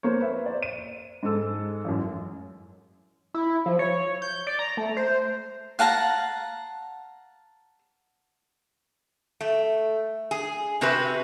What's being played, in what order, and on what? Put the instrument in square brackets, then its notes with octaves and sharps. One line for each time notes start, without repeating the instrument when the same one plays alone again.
[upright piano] A#3 C5 C#5
B4 E5
C5 D5
D#7
G#2 G#3 A4 E6
A1 F#2
[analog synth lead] E4
F3
C#5
G6
D5
A#5
A3
C5
[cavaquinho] F5 F#5 A5 A#5
[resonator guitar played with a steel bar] A3
G#4
C3 C4 F#4 G#4 B4 E5